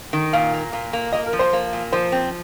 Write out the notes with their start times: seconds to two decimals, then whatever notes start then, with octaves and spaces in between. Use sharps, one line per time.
0.13 D#3
0.33 A#2 F5
0.53 A#3
0.73 A#2
0.93 A#3
1.13 A#3 D#5
1.26 A#4
1.33 F3
1.39 C5
1.53 A#3
1.73 A#2
1.92 F3 C5
2.12 C4